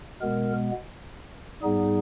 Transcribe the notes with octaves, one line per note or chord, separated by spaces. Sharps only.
B2 G#3 B3 A#4
G#2 G3 B3 D#4 G#4